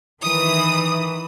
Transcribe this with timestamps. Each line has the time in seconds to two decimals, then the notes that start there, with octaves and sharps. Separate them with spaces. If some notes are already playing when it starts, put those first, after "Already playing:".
0.22 D#3 E3 D#6 D#7